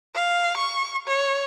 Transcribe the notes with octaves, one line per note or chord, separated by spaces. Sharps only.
F5
C#6
C#5